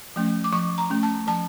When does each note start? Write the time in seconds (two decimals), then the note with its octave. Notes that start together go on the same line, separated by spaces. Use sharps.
0.16 F3 A3 C#4
0.44 D6
0.52 F3 C#6
0.78 A#5
0.90 A3 C#4
1.03 A5
1.27 F3 A5